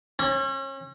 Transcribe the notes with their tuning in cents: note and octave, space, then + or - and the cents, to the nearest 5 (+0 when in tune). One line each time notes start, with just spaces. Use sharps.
C#4 -35